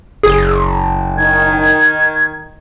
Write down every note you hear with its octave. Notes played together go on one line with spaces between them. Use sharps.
F#1 G#4
D#3 G#6